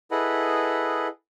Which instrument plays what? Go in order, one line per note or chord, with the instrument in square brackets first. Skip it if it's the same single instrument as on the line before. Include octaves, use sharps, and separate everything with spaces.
[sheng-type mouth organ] E4 G#4 A4 B4 D#5 F#5